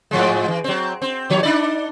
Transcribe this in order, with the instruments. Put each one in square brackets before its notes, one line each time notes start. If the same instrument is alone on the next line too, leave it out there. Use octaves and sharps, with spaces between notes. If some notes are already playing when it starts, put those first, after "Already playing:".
[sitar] G#2 F3 G#3
E3
F#3 C4
C4
D#2 F3 C#5
D4 D#4 D5